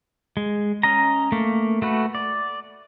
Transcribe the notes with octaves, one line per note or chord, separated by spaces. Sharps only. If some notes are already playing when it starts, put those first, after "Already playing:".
G#3
C#4 D#5 A#5
A3 A#3
A3 F#4 B4
D5